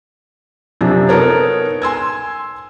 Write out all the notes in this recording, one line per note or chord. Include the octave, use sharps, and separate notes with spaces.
F#2 C3 F3 D4
B3 D#4 A4 A#4 C#5
G#5 C6 E6 G#6